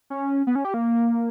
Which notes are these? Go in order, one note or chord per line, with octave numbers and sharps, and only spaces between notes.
C#4
B3
C#4
G4
A#3